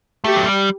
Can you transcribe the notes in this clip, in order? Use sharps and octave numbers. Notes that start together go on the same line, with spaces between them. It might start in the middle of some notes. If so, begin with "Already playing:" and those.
A3 G4
F#3
G3